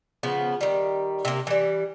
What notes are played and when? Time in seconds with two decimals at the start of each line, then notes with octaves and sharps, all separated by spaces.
0.23 C#3 F3 B3
0.61 D#3 G3
1.25 C3 A#3
1.47 E3 G3